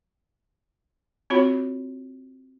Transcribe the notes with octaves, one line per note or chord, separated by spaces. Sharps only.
C4 F4 F#4 C#5 B5